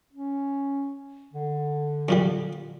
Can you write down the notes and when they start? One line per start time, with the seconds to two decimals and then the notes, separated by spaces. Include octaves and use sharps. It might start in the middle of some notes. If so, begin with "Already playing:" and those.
0.13 C#4
1.33 D3
2.09 F#2 A#2 G3